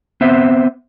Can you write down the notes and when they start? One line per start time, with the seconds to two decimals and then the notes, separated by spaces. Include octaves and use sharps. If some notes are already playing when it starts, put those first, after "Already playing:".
0.21 B3 C4 C5 E5